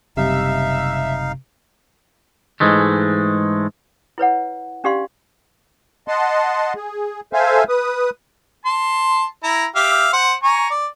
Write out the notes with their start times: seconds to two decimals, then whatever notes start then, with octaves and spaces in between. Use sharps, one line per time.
0.17 F#1 C3 G3 D#4 E5 F5
2.60 G#2 E3 G#3 A3
4.18 E4 B4 C#5 F#5
4.84 C#4 D4 G4 D5 F5 C6
6.08 D#5 F#5 A5 C6
6.76 G#4
7.33 A4 C5 E5 F5 G#5
7.69 B4 D#6
8.65 A5 C6
9.43 E4 A#5
9.76 G4 E5 F5
10.13 C5 F#5
10.43 G#5 A#5 C#6
10.70 D5